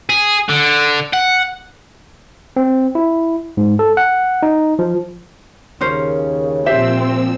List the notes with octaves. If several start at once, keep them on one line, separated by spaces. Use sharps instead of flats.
G#4
D3
F#5
C4
E4
G#2
A4
F#5
D#4
F3
D#2 C#3 C#4 A#4 C5
A#2 F3 C4 G4 C5 E5 E6